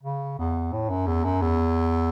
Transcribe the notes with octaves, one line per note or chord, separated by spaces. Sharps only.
C#3
E2
A2
F#2
E2
F#2
E2